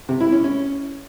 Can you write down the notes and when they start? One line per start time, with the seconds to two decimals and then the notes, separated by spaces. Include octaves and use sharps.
0.09 C3
0.21 E4
0.32 C#4
0.44 C#4